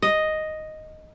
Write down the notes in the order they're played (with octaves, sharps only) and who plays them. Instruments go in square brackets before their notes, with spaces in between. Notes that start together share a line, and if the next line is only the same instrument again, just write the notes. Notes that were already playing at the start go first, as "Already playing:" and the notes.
[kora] D#5